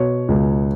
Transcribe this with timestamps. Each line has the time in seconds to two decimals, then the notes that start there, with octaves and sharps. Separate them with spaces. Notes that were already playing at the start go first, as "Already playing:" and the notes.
Already playing: B2 C#5
0.28 C#2